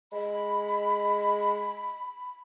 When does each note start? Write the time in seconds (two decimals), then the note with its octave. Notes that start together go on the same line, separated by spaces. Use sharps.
0.12 G#3 B5